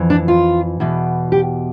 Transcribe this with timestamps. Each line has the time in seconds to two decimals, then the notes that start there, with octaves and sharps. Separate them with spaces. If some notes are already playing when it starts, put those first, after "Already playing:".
Already playing: F2 E3
0.10 D4
0.28 F4
0.80 E2 B2
1.32 G4